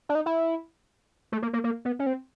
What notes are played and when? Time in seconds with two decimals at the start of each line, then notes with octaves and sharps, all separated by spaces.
0.09 D4
0.15 D#4
0.26 E4
1.32 A3
1.42 A#3
1.53 A#3
1.64 A#3
1.85 B3
1.99 C#4
2.06 C4